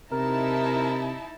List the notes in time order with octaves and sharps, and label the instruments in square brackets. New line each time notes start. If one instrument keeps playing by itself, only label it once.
[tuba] C3 [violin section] D#4 E4 A5 [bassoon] A#4